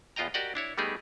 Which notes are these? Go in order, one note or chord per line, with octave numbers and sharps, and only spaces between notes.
E2 B3 F4 D#5 G5 A#5
F#4 G4 A#4 D5 D#5 F#5
D4 E4 C#5
G3 A3 B3 D#4 G4 G#4